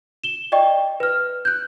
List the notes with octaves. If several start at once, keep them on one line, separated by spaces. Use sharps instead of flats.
E7 G7
D5 D#5 G5 C#6
B4 F6
F#6 G6